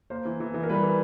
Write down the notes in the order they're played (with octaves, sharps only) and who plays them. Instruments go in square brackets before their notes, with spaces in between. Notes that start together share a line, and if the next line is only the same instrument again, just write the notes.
[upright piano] A#3 C5
E3
E3
E3
A#4
G3 B4
E3